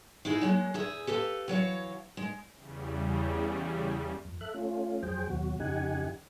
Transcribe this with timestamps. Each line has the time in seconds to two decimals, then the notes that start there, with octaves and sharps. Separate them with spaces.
0.25 D#4 E4 F#4 G#4
0.41 F#3 G#3 A#3
0.74 E2 G#4 E5
1.07 G4 A4 B4 F5
1.48 E3 F#3 C#5 F5
2.17 G#3
2.55 E2 C#3 G3
4.25 F2
4.41 A4 E5 F#6
4.54 A3 C#4 F4
5.03 F2 F#3 G#4 C5 G5
5.30 D#2 B2 F#3 F#4
5.60 F2 C#3 D#4 G4 F#5 G#5